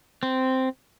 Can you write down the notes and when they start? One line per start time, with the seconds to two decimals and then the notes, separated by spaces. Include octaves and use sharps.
0.23 C4